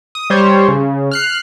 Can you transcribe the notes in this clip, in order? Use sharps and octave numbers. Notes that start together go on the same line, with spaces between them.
D#6
G3 C5 C#5
C#3
F6 F#6 C7